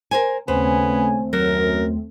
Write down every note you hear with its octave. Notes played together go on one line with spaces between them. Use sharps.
A#4 C5 G#5
D#2 C#3 A3 B3 C4 C5 G#5
F#2 F#3 A#4